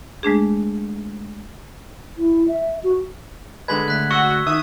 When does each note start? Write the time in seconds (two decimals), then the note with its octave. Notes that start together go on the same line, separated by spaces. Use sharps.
0.23 G#3 A3 D4 G#4
2.16 E4
2.48 E5
2.83 F#4
3.68 D3 G#3 B4 G#6 B6 F#7
3.88 D2 F#6 B6
4.11 F#4 C#6 E6
4.47 D#3 E5 D#6